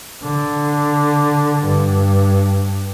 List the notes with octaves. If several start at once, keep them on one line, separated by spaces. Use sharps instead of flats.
D3
G2